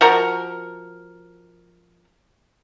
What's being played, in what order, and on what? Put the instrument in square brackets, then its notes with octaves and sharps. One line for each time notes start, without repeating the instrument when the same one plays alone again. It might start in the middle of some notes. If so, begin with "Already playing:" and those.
[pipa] F3 F#4 A#4